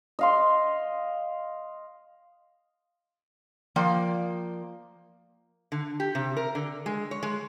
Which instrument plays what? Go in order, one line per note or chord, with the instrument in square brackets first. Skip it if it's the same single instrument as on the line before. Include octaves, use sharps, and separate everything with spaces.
[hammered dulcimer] D#5 F5 C6
[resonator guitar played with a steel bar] F3 A#3 D5 G5
D3
G4
C3
A#4
D3
G#3
C#5
G#3